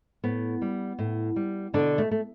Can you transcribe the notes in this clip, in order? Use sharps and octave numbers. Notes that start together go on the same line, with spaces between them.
A2 B3
G3
A2
G3
B2 D3 D4
A3
A3